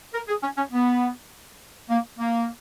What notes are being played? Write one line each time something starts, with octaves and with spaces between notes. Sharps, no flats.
A#4
G#4
C#4
C#4
B3
A#3
A#3